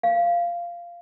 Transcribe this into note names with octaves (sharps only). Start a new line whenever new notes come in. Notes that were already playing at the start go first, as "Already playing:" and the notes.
F5